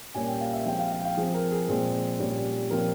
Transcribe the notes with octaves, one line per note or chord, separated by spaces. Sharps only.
A#2 G3 A#3 C#4 G#5
G5
F5
E5
F3 G#3 C4 G5
F5
F5
G5
F5
F3 C4 G#4
A#4
G#4
A#2 F3 G#3 C4 G#4
A#2 G3 C#4
A#2 F3 C4 A#4